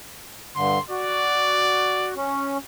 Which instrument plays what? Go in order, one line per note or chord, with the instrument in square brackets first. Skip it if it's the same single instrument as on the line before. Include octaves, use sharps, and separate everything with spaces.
[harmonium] G2 D3 [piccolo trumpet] C6
[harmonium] F#4 [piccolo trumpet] D5
[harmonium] C#4